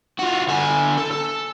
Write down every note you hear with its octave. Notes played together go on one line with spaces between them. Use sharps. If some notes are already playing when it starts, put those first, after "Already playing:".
F4 F#4
D3 G#5
A4
A4